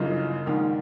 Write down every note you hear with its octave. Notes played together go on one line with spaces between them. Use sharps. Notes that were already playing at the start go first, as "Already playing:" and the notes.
Already playing: G1 F#2 C#3 E3 D#4 F4
A#1 G#2 D#3